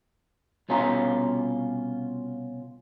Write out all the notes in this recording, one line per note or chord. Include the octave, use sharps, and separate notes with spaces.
C2 B2 C#4 F4 A#5